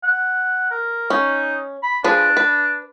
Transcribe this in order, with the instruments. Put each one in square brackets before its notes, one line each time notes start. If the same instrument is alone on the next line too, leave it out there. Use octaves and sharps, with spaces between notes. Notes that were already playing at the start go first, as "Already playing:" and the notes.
[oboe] F#5
A#4
[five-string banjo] C#4 [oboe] D#4
[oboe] B5
[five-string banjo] F3 G#4 B4 [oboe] D4
[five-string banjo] B4